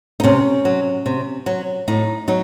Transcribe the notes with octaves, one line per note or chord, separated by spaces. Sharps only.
D#4
C3 C#4
F#3
C3
F#3
A2 D#4
F#3 D#4